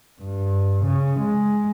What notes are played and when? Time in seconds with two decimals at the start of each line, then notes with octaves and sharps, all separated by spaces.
0.21 G2
0.85 C#3
1.20 G#3